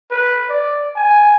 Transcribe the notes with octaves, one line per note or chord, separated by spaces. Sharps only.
B4
D5
G#5